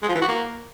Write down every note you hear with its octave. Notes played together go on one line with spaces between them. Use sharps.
G#3
F3
E3
F#4
A#3